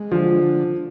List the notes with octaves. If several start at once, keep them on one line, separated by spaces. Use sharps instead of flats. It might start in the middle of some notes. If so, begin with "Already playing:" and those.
Already playing: G#3
D3 F3